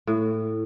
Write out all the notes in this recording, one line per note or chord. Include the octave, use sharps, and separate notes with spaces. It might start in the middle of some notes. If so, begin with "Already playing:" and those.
A2